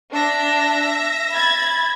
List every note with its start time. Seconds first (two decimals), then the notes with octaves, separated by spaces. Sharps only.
0.13 D4 E5 A#6
1.34 B5 G#6 A6